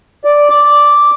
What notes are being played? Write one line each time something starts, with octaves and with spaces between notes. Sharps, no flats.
D5
D6